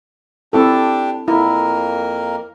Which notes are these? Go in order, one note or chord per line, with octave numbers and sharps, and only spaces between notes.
C4 D4 E4 G4 A4
F2 A#3 E4 A#4